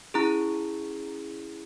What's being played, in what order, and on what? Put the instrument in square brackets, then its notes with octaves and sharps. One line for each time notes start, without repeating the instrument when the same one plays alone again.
[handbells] C#4 E4 G#4 A#5